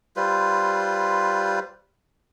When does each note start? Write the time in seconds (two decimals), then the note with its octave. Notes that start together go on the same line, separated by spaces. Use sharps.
0.16 G3 F4 B4 C5